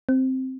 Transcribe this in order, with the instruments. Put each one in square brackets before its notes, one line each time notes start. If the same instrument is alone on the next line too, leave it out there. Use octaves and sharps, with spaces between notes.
[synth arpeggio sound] C4